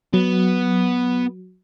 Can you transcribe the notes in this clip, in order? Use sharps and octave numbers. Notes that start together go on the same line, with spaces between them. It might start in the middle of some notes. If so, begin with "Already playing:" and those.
F#3 B3